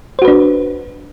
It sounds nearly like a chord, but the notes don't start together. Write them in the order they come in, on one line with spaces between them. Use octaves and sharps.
C5 F#4 B4 D4